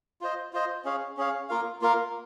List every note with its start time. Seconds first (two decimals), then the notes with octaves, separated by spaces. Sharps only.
0.21 F4 C5 D#5
0.53 F4 C5 D#5
0.85 C#4 G#4 C#5 F5
1.17 C#4 G#4 C#5 F5
1.49 A#3 F4 A#4 F5
1.82 A#3 F4 A#4 F5